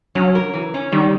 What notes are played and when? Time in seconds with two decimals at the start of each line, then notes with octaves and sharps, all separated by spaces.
0.15 F#3 C#4
0.35 A#4
0.54 E3
0.74 C#4
0.92 D#3 G3